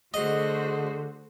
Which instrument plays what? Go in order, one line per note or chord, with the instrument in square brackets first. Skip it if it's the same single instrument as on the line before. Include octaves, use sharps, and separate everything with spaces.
[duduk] D3 [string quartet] A3 F#4 C5 [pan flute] G#4 [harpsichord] D#5